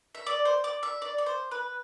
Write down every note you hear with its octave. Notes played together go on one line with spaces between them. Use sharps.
E5
D5
C5
D5
E5
D5
D5
C5
B4